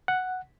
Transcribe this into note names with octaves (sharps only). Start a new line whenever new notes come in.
F#5